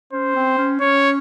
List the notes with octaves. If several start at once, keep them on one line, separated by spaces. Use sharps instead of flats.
C#4 C5
C4
C#4
C#4 C#5